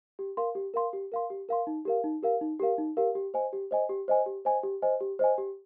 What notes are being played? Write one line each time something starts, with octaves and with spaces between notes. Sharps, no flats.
G4
A#4 F5 C6
G4
A#4 F5 C6
G4
A#4 F5 C6
G4
A#4 F5 C6
D#4
G4 A#4 F5
D#4
G4 A#4 F5
D#4
G4 A#4 F5
D#4
G4 A#4 F5
G4
C5 D#5 G#5
G4
C5 D#5 G#5
G4
C5 D#5 G#5
G4
C5 D#5 G#5
G4
C5 D#5 G#5
G4
C5 D#5 G#5
G4